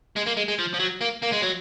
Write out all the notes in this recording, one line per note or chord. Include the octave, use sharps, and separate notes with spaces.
G#3
A#3
G#3
G#3
F3
F3
F#3
A#3
A#3
G#3
F#3